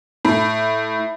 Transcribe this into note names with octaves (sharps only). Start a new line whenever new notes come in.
A2